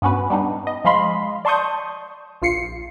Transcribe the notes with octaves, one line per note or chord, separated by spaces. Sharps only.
G2 B3 C#4 F#4 B4
G3 B3 D4 D#4
D#5
F3 G#3 D#5 F5 B5 C6
D5 A5 C6 C#6 D#6 G6
A#1 F4 C7 C#7